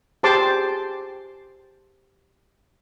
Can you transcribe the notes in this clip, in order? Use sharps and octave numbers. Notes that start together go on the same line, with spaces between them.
G4 G#4 C5 A5 C6 D6